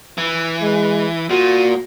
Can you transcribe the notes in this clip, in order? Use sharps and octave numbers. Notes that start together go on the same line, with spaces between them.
E3
G#3
A#2 F#4